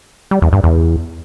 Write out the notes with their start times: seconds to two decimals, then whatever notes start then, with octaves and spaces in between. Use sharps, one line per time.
0.31 G3
0.42 E2
0.53 G2
0.63 E2